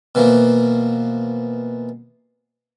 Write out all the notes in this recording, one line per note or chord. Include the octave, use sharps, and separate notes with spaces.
B2 E3 F3 A#3